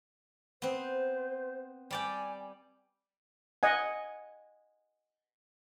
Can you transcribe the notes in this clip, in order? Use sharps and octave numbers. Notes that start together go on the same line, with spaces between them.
B3 C4 C5
G3 D5 G5 G#5
D#5 F#5 G#5